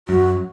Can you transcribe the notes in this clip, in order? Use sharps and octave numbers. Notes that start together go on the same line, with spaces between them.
F#2 F#4